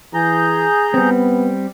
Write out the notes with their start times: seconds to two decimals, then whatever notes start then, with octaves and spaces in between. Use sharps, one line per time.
0.14 E3 G#4 A#5 G6
0.94 G3 B3 C4